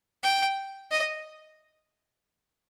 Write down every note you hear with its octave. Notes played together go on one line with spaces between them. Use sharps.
G5
D#5